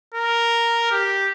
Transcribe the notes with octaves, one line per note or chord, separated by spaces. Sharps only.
A#4
G4